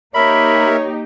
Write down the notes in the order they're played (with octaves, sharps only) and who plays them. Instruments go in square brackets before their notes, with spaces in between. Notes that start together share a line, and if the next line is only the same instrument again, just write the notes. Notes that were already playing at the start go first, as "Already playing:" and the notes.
[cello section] A#3 D#4 G4 [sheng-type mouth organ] A#4 E5 [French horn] C#5 [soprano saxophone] B5